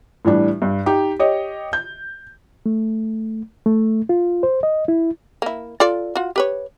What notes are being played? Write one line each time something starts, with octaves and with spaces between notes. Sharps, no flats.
A2 E3 G3 D4
G2
D#4 G4
G4 C#5 D#5
G6
A3
A3
F4
C5
D#5
E4
A#3 E4
F4 A4 D5
F4 F#4
G4 B4 C#5